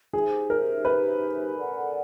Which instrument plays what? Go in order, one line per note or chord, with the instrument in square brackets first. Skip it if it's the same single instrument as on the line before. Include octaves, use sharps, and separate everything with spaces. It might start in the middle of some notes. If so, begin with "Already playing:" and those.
[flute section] D#4 G4 C5 E5 [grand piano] G#4
[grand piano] A#4
B4
[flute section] A4 D5 F#5